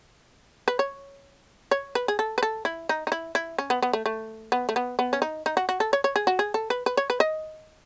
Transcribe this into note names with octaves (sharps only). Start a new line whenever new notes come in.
B4
C#5
C#5
B4
G#4
A4
B4
A4
E4
D#4
D#4
E4
E4
C#4
B3
B3
A3
A3
B3
A3
B3
B3
C#4
D#4
D#4
F#4
F#4
A4
C#5
C#5
G#4
F#4
G#4
A4
B4
B4
C#5
B4
D#5